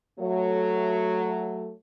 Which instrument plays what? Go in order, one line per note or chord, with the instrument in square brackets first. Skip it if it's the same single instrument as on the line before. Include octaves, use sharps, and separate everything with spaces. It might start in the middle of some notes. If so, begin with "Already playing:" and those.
[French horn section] F#3 A3